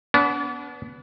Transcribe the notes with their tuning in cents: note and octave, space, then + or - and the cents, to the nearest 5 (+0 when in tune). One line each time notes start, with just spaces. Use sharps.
B3 +0 D4 -40